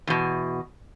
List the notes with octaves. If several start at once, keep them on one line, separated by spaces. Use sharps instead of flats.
E2 B2